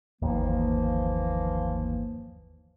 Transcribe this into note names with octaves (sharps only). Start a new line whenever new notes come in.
G1 D#2 E3 F3 A#3